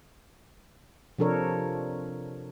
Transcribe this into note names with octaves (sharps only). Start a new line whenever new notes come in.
C3 F3 D4 A4 A#4 C#5